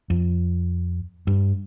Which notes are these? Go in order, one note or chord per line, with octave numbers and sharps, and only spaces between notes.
F2
G2